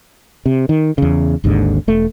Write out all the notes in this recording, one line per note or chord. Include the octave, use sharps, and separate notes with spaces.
C3
D#3
E2 C#3
G#1 D#2 G#2 D3
E1 A3